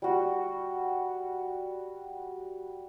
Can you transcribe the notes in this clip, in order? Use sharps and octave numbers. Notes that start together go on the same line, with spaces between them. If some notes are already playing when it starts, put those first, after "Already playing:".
G3 F#4